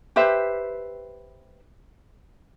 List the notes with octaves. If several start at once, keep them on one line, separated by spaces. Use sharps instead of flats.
G4 B4 C5 E5